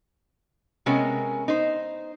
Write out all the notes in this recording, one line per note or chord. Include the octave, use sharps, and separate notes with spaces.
C3 G#3 B3 C#4 A#4
D#4 C5